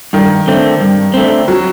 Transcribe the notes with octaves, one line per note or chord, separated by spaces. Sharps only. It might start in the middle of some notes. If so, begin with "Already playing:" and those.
G2 D#3
D3 A3 C4
G2
D3 A3 C4
F#3